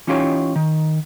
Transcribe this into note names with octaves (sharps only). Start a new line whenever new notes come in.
E3 C#4 D#4 F4 G4 C#5
D#3